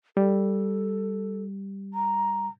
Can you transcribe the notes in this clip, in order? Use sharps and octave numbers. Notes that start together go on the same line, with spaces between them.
G3 A4
A#5